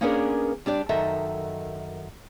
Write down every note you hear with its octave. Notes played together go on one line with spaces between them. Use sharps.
A#3 B3 C#4 D4 G#4 A#4
G3 D4 G4 D5
F#2 D#3 A4 D#5 E5